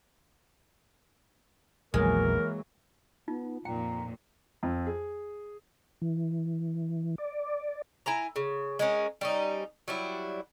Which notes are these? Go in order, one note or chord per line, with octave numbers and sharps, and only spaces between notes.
A#1 E2 D#3 E3 F#3 G#3 A#3 A#4
B3 D#4 F4
F2 A#2 G5 A#5
F2
G#4
E3
D5
E4 G#5 A#5
C#3
G#3 A#3 C#4
G3 C#4 D#4
F#3 G3 E4